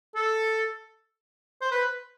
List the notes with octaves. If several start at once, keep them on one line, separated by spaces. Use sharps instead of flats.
A4
C5
B4